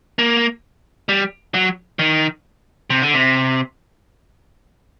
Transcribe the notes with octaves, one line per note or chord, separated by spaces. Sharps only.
A#3
G3
F#3
D#3
C3
D3
C3